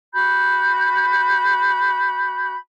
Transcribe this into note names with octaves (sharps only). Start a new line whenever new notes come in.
F#4 B5 G6